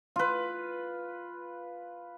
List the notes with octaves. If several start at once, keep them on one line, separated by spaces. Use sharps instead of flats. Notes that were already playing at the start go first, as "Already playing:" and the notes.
F4 B4